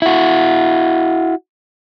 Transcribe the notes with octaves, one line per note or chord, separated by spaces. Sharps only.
E4 F#4